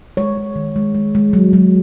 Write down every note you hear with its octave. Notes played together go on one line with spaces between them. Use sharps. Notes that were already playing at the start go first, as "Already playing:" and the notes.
G#3 C#5
G#3
D#3
G#3
G#3
G#3
F#3
F#3